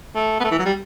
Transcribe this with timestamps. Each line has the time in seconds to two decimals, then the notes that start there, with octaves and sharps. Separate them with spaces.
0.16 A3
0.40 B3
0.44 A3
0.51 E3
0.59 F#3
0.66 G3